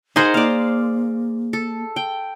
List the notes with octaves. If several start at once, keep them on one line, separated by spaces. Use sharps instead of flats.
D#4 G#4 A#4 C5 F#5
A#3 D5 F5
A4
G5